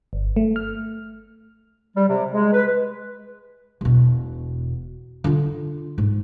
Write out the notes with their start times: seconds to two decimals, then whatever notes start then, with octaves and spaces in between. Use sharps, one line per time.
0.13 G1
0.36 A3
0.56 F6
1.96 G3
2.08 C3
2.33 G#3
2.53 B4
3.81 E1 B2
5.24 D3 F4
5.98 G#2